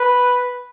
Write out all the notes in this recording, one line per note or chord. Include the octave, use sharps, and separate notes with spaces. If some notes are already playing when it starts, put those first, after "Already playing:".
Already playing: B4